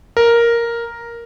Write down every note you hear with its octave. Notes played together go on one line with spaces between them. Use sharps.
A#4